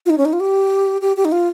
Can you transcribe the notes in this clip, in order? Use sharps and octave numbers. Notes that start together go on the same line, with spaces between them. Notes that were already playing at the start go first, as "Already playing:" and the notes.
F4
D#4
C#4
D#4
F4
G4
G4
G4
D#4
F4